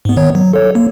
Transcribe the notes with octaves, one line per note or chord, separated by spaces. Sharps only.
G#2 B3
D#3 B3 C#5
F#3
A4 C#5
A#3